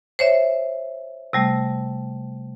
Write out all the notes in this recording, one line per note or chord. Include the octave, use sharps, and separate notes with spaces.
C5 C#5 E5
C3 G3 A3